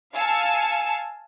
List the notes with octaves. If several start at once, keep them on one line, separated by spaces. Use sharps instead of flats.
F5 G#5 A5 E6 C#7